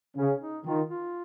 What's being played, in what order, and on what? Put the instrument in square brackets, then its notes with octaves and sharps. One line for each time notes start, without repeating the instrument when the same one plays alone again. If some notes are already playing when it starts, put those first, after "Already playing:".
[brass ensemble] C#3 [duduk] C#4
[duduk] D#4
[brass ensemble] D#3 [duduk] F4
[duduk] F4